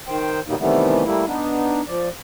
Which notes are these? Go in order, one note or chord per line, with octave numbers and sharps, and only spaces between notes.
D#3 C5 G5
E2 B2 F#3 G3 A#3 D#4
C3 D#3 E3 G3 A3 B3
G3 A3 A#3 E4
B3 D4 D#4
F3 D5